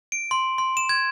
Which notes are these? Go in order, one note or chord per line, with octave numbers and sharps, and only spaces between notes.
D7
C6
C6
E7
G#6